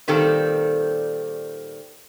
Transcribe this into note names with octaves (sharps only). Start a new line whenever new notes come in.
A#2 D#3 G3 C4 A4